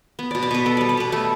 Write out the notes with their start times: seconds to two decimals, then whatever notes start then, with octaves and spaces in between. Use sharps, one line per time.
0.19 B3
0.31 B2 D5
0.43 D5
0.51 B2 B4
0.66 B3 A4
0.77 G3 D5
0.89 D5
0.97 B2 B4
1.12 A3 A4